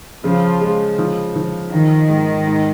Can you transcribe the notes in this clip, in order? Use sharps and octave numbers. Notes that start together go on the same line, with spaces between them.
C#3 F3
G#3
F3
F3
D#3 D#4
G#2
G#2